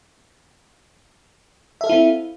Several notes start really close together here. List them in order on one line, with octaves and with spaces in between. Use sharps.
E5 A4 F5 E4 C4